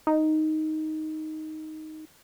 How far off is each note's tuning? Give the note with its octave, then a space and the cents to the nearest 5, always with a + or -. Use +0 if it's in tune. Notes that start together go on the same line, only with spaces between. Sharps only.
D#4 +5